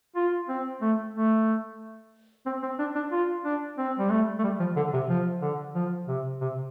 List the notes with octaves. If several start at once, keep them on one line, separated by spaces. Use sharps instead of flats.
F4
C4
A3
A3
C4
C4
D4
D4
F4
D4
C4
G3
A3
A3
G3
F3
D3
C3
F3
D3
F3
C3
C3